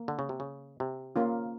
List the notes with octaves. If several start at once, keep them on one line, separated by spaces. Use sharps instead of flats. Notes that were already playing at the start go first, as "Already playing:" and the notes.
Already playing: A#3
D3
C#3
C3
C#3
C3
A#3 C#4 F4